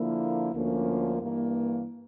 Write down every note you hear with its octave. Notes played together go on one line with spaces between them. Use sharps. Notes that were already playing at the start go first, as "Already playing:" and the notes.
Already playing: D3 F3 A#3 E4
D2 D3 F3 A#3 C#4
G2 E3 A#3